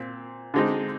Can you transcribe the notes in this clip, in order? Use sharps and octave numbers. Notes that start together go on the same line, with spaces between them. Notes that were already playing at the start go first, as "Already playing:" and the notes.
Already playing: A#2 C4
D3 G#3 C4 D#4